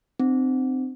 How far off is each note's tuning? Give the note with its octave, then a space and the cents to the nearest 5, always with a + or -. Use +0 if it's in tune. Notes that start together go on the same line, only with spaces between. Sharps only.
C4 -15 D#4 -45